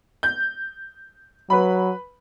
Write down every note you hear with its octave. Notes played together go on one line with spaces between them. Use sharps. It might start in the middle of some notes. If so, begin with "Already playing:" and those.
G6
F#3 B4 B5